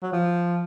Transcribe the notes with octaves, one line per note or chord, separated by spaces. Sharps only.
F#3
F3